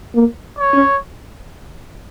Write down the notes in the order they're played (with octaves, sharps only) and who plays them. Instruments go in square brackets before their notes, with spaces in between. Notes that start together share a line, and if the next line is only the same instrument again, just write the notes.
[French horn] A#3
[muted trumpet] C#5
[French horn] C#4